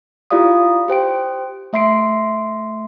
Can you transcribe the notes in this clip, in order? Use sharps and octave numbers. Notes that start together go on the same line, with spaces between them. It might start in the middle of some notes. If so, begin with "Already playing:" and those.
E4 F4 G4 D5 F5 D#6
G4 C5 G5 D7
A3 E5 C6 C7 D7